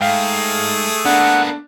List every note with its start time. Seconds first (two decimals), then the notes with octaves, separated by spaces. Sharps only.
0.01 G#2 A3 G#4 F5 G5
1.05 A#3 B3 D4 F#5